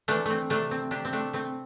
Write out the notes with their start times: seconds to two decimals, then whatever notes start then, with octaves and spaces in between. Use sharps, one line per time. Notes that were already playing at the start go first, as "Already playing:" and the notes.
0.08 E3 A3 D4
0.26 A3 C4
0.50 C3 A3 D4
0.71 C4
0.91 C3 D4 G4
1.05 C4
1.13 A3 D4
1.33 A3 C4